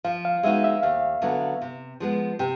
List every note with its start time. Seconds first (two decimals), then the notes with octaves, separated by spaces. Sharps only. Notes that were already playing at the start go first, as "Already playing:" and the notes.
0.04 F3 F5
0.25 F5
0.43 G#3 B3 D#4 F#4 E5
0.64 E5
0.82 D#2 F5
1.22 D3 F#3 B3
1.61 C3
2.00 F3 G#3 B3
2.39 C3 G5